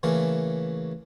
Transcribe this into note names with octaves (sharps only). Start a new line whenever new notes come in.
C#3 E3 A3 A#3